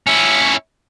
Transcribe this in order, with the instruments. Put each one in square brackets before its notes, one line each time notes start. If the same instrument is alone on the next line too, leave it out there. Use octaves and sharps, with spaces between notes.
[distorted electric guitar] C#4 E4